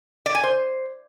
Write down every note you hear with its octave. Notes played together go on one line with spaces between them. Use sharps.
D5
G#5
C5